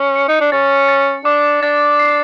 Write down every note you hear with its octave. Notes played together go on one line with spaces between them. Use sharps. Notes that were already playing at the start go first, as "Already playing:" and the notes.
Already playing: C#4
C#7
D#4
D4
C#4 A6
A6
D4 D6
D4 A6
C7